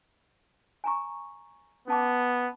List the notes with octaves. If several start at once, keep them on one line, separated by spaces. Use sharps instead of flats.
G#5 A#5 C#6
B3 C#4 A5 D6